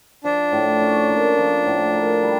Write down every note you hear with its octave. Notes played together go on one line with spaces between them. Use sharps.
F3 D4
A2
C#4
A#3
F3
A2
A#3
G3